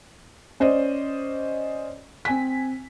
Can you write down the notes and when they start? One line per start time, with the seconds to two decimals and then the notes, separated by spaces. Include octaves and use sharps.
0.60 C#4 C5 D5 D#5
2.25 C4 G#5 B6